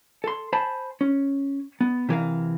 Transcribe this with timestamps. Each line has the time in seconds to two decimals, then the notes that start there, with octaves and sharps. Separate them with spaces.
0.24 A4 C6
0.53 C5 G#5 A5 B5
1.01 C#4
1.81 B3
2.09 C3 E3 A#4 F5